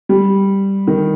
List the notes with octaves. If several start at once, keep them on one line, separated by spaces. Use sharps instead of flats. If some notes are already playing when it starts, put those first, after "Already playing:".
G3
D#3